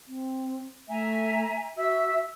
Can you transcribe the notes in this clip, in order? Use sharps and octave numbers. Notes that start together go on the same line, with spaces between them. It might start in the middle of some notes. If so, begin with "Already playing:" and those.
C4
A3 E5 G#5 A#5
F#4 E5 E6